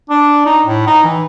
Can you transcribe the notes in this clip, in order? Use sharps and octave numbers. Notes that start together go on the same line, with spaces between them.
D4
D#4
A2
D#4
E3